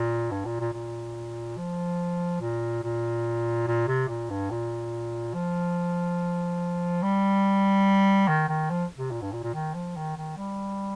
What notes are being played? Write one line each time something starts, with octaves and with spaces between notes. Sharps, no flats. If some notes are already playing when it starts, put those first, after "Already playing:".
Already playing: A#2
G2
A#2
A#2
A#2
F3
A#2
A#2
A#2
C3
A#2
G2
A#2
F3
G3
D#3
D#3
F3
C3
A#2
G2
A#2
A#2
D#3
F3
D#3
D#3
G3